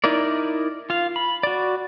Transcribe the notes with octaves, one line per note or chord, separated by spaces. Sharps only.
D#4 E4 A#4 D5
F4 F5
B5
F#4 D5